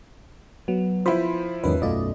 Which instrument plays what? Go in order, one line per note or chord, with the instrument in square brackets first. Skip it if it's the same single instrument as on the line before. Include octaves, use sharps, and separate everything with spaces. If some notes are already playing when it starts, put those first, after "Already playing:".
[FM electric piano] F#3 [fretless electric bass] B3
[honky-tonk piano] F3 E4 [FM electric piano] C5 B5
[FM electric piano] E2 C#4 B4 [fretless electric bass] G#2 D#3 F#3
[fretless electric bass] B1 F#2 A3 [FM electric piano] F4 D5 D#5